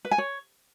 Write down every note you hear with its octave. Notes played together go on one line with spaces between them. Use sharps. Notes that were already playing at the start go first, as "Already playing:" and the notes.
B4
G#5
C#5